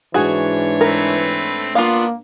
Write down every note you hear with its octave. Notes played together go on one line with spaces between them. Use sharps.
G#2 E3 D4 F#4 G#4 C#5
A3 C4 A#4 B4
A#3 B3 D4 F4 F5